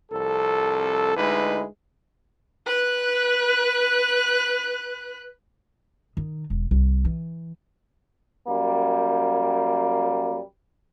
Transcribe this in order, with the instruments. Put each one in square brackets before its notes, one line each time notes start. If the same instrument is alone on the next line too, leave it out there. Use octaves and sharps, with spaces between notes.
[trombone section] C2 F2 A4
D2 G#3 D#4 E4 B4
[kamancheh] B4 F#6
[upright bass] D#3
E1
C2
E3
[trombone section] F#2 G3 A#3